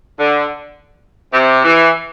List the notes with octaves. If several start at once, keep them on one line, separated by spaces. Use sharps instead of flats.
D3
C3
E3